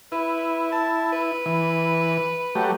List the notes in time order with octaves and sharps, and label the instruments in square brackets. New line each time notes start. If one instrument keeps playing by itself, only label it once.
[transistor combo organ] E4 [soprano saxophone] B4
[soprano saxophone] A5
B4
[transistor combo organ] E3
F#3 A3 G4